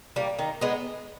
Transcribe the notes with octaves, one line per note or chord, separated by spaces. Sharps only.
G3 A#3
D#3
G#3 B3